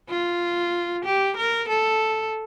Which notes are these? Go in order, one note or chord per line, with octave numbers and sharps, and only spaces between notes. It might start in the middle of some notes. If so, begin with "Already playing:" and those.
F4
G4
A#4
A4